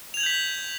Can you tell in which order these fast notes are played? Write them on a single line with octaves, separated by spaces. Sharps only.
F7 G#6 F#7 G6 B6